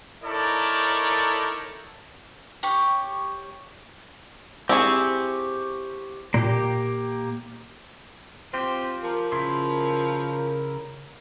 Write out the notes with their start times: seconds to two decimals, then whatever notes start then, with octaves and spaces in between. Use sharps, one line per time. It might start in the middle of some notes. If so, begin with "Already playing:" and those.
0.24 D#4 E4 A4 A#4 C#5 D5
2.63 G4 C#5
4.69 C4 E4 G4 G#4 C#6
6.34 A#2 A#3 G4
8.54 C4 F4 G4
9.03 F3 A#4
9.32 C#3 E4 C6